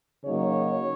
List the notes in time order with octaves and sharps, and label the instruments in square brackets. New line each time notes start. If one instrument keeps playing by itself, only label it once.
[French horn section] C#3 F#3 A#3 D#4 C#5